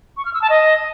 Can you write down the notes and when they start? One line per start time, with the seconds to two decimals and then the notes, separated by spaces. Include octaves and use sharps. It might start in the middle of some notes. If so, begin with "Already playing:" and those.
0.17 C#6
0.25 F6
0.33 E6
0.42 A5
0.50 D#5